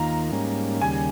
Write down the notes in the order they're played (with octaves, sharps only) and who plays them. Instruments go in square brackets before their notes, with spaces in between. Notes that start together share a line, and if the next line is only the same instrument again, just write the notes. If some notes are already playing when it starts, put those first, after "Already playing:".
Already playing: [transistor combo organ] D#2 D#3 A#3 F4 [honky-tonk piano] A#5
[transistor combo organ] G#2 G3 A#3 C#4
[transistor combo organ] D#2 C#3 G3 [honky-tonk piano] G#5